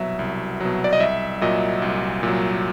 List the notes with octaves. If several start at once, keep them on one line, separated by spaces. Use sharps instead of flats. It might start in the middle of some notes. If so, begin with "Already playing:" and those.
Already playing: C2 B2 F#3 E5
C2
B2 F#3
D5
D#5
C2 E5
A#2 F#3 D#5
C2
A#2 F#3